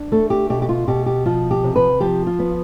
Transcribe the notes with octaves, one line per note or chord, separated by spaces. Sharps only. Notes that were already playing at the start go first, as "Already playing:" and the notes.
Already playing: D4
A3 A4
G4
B2 G4
G4
F4
B2 G4
G4
F3 F4
G4
C3
B4
F3 G4
F4
B3